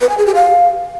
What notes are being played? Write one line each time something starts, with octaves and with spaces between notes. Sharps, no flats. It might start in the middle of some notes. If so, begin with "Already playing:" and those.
B4
G#5
G#4
G4
F5